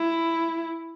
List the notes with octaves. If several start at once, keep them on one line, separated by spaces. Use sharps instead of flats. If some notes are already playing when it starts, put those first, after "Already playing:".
Already playing: E4